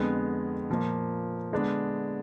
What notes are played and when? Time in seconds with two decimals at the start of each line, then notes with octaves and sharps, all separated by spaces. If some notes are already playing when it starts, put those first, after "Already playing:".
Already playing: F2 D3 G#3 B3
0.70 A#2 F3 A#3
1.52 D3 G#3 B3 D4